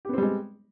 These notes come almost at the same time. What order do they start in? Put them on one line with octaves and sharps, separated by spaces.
G4 B3 C4 G3 G#3